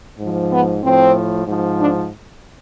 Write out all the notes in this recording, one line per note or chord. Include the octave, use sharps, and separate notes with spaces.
G#2 F3
B3
A2 F3 C4
G#2 F3
D4